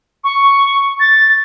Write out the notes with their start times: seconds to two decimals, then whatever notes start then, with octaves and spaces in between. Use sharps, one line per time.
0.24 C#6
1.00 A6